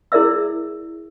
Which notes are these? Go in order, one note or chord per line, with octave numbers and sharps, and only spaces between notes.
E4 G#4 A#4 D5 E5 E6